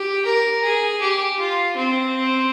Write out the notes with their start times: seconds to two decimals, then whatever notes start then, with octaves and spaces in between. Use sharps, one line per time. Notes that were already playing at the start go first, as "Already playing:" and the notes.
Already playing: G4
0.25 A#4
0.63 G#4
1.01 G4
1.39 F4
1.76 C4